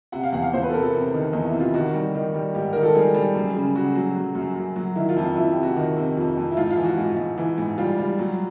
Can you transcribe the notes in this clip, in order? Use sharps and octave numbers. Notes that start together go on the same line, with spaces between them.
C3 F#5
F5
E2 F#5
F5
E2 C5
B4
A4
C3 A#4
A4
C3
D#3
E2 D#4
E4
C3
F4
D#3 F#4
G3
D#3
G3
G#2 G4
D#3 A#4
A4
G3 G#4
G3
F#2
C#3
C#3 F#4
F#3
F#3
F#2
F#2
F#3
D#3 E4
F4
F2
F4
F2 E4
C3 G4
F#4
D#3
C3
F2
F2
E4
G#2 F4
F4
E3
F#4
G#2 F4
G#2
E3
G#2
G3 F4
G3
F#3